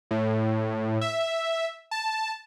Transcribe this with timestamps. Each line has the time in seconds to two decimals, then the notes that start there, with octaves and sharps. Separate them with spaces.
0.11 A2
1.01 E5
1.91 A5